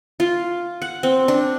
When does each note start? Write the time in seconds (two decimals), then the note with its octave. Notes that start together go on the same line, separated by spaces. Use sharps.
0.20 F4
0.82 F#5
1.03 C4
1.28 D4